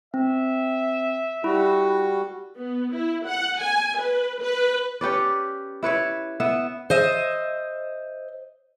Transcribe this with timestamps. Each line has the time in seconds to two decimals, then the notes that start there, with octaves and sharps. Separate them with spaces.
0.14 C4 E5
1.44 G3 E4 F#4
2.56 B3
2.93 E4
3.26 F#5
3.60 G#5
3.99 B4
4.41 B4
5.01 C#4 G4 B4 D5
5.83 E4 B4 C#5 E5
6.40 B3 B4 E5
6.90 C5 D#5 E5